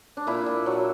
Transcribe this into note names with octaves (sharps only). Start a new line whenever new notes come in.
D4
A#2 E4
A#2
F#3